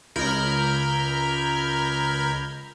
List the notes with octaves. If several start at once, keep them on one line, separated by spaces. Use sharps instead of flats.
C#2 A#4 B5 F6 G6 G#6